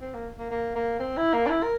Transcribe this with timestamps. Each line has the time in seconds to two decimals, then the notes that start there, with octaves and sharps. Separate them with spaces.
0.01 C4
0.14 A#3
0.39 A#3
0.51 A#3
0.75 A#3
1.00 C4
1.18 E4
1.33 A#3
1.46 D4
1.50 E4
1.63 A#4